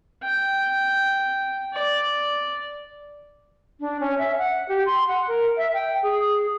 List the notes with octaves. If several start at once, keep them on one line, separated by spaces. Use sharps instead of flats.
G5
D5
D4
C#4
E5
F#5
G4
C6
F#5
A#4
E5
G5
G#4